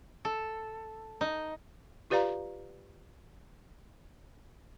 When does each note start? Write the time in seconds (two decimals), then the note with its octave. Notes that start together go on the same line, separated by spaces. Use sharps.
0.25 A4
1.21 D#4
2.10 F4 G4 B4 D5 F5 A#5